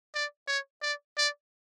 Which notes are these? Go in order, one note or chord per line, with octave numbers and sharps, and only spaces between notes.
D5
C#5
D5
D5